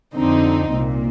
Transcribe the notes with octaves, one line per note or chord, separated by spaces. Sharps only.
F2 D3 C4 D#4
C2 A#2